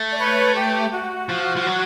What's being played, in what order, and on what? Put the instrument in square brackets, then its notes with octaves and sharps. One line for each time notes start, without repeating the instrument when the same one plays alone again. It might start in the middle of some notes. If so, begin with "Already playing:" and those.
Already playing: [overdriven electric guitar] A3
[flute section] D5
B4 C#5
G4
F#4
[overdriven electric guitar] F3
F3
F#3